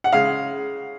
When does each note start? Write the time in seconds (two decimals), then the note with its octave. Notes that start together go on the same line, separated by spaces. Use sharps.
0.04 F#5
0.12 C#3 G#3 F5